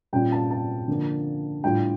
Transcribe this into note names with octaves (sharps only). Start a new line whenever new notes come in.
A#2 G3 C#4 F4 G5
A5
A5
D3 F3 A#3
A2 G3 D4 F4 G5